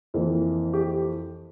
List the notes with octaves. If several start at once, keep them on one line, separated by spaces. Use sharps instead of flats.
F2 E3 A#3
G4